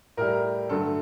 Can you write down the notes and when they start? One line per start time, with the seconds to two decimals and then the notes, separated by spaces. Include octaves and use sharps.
0.17 A2 G3 A#4
0.69 G2 D3 F#3 A3 A4